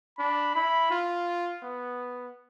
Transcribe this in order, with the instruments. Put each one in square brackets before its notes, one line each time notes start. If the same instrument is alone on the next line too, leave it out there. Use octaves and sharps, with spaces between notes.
[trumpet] D4 [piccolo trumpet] B5
[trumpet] E4 [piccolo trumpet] B5
[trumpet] F4
B3